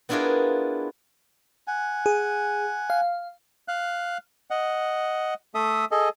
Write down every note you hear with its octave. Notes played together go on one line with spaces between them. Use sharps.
B3 D4 E4 F4 G#4 A#4
F#5 G#5
G#4
F5
F5 F#6
D#5 F#5
A3 A4 E5 D#6
G#4 A4 D#5